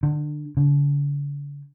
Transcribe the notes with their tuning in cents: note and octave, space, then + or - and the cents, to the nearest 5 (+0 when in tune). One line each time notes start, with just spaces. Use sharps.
D3 +25
D3 -45